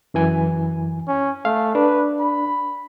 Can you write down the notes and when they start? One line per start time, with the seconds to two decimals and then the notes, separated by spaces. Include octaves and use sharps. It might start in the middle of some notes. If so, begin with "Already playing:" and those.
0.14 F#2 E3 G#5
1.08 C#4
1.45 A3 F5
1.75 D4 B4
2.20 B5